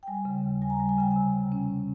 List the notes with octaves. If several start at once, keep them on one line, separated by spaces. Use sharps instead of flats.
G5
G3 G#5
C#3
D#2
G3 G#5
A#5
G#5
G3
G#5
C#3 G5
G#5
C3
C3
C#4